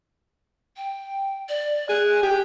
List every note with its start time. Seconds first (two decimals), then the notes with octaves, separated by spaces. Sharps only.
0.77 G5
1.49 D5
1.89 G#4 F#6
2.23 G4 G#4